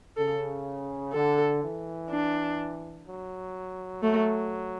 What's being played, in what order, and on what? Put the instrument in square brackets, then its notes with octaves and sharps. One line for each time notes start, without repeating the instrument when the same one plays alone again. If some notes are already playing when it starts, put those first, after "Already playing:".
[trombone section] C#3 [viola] A4
[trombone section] D3 [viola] A4
[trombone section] E3
[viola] D4
[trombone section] F#3
[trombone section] F#3 [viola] A3